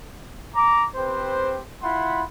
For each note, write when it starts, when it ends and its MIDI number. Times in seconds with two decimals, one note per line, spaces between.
0.56 0.86 82
0.56 0.86 86
0.96 1.61 60
0.96 1.61 67
0.96 1.61 71
0.96 1.61 72
1.83 2.23 64
1.83 2.23 65
1.83 2.23 78
1.83 2.23 83
1.83 2.23 84